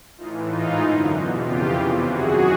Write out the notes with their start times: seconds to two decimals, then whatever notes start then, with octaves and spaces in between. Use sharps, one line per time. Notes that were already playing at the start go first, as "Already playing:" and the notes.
0.17 A2 E3 D#4 F4
0.48 G#2 E3 D#4 F4
0.80 F#2 D3
1.11 E2 B2 E4 F#4
1.42 F2 C#3 E3 F4 G4
1.74 E2 C3 E3
2.04 F#2 D#3 F#4 G#4